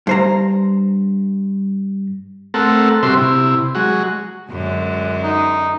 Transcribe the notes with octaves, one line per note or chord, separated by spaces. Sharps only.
G2 C5 A#5
A3 C4 A4 A#4 F#5
C3 G3 C4 F#4 E5 C6
C3 E4
F#3 G#3 F#4
F#2 D3 G#3
D#4